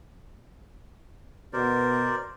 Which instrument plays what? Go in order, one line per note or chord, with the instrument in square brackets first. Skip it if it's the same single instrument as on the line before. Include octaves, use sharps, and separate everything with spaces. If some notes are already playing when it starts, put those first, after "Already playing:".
[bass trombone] B2 [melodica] A#4 C5 D5